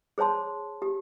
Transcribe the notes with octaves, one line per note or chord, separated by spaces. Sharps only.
G#4 C5 C#5 A5 C6
G4